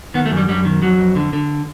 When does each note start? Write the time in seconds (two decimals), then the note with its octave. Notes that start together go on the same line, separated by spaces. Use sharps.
0.14 D#3 B3
0.26 A3
0.31 F#2
0.37 G3
0.48 F#2 G3
0.65 D#3
0.82 F2 F#3
0.99 F2
1.16 D3
1.33 D3